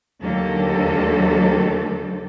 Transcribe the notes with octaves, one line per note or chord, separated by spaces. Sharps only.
D#2 D3 F#3 A#3 G4 A4